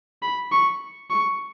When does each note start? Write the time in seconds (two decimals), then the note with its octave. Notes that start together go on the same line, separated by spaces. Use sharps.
0.22 B5
0.52 C#6
1.10 C#6